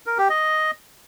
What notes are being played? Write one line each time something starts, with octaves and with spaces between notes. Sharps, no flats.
A#4
G4
D#5